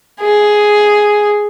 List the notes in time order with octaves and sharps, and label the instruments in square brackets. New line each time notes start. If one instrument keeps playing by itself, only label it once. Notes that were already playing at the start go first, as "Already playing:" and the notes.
[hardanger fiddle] G#4